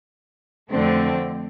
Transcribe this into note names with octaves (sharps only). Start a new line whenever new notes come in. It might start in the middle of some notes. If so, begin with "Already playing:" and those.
F2 D3 A3 C4